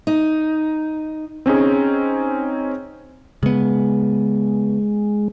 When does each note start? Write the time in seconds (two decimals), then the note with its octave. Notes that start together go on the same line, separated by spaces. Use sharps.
0.07 D#4
1.46 C4 C#4 D#4 G#4
3.43 C#3 G#3 B3